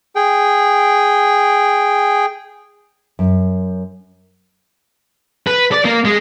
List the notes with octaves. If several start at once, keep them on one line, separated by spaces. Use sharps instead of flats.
G#4 G5
F#2
B4
D5
A#3
G#3